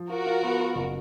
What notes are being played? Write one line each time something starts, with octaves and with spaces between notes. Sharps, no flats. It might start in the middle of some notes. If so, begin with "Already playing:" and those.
Already playing: F3
F4 F#4 A#4
F4
B3
F4
F#1